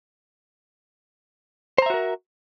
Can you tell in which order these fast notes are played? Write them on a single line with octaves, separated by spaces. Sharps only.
C5 A#5 E5 F#4 A#4